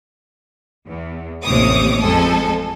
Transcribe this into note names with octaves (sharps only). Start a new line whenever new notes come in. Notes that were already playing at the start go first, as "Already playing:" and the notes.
E2
A1 D#2 C3 C#5 D6 D#6
F2 G#3 A4 G#5